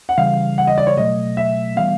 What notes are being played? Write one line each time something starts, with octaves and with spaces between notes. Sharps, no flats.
F#5
C#3 E3 G3 F5
F#5
D#5
D5
C#5
B2 F#3 A3 D#5
E5
E3 G3 B3 F5